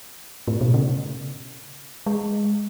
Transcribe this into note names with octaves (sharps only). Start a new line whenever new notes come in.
A2
B2
C#3
G#3